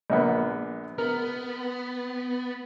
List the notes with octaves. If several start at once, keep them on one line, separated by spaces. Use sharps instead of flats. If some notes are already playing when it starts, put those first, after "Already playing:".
A#1 A#3 B3
B3 A#4